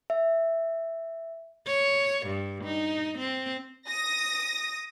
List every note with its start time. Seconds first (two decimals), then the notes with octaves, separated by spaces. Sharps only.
0.10 E5
1.67 C#5
2.27 G2
2.64 D#4
3.19 C4
3.88 D#6 A#6